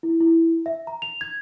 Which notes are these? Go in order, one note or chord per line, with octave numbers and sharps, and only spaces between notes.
E4
E4
E5
A#5
F7
G#6